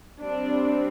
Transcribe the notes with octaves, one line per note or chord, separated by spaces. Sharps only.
G3 C4 D4